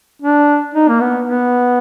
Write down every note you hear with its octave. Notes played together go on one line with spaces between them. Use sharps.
D4
D#4
A#3
B3
B3